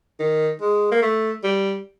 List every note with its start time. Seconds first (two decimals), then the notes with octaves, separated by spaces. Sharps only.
0.19 D#3
0.61 G#3
0.91 A#3
1.02 A3
1.44 G3